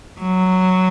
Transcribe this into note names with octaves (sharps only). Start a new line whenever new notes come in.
F#3